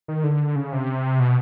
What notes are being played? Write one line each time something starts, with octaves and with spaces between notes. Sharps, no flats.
D#3
D3
C#3
C3
B2